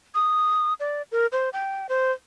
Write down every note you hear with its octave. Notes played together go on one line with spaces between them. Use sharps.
D#6
D5
A#4
C5
G5
C5